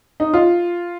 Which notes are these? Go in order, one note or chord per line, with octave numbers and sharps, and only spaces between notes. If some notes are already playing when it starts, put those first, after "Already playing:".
D#4
F4